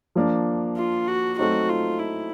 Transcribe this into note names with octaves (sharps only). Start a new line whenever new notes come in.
F3 A#3 D4
F4
F#4
F#3 A3 C4 D#4 F#4
F4
E4